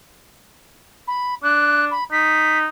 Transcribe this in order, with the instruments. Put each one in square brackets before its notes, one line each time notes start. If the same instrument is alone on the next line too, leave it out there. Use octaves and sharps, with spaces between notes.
[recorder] B5
[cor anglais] D4 [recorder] F#6
[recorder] B5
[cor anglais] D#4 [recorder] B6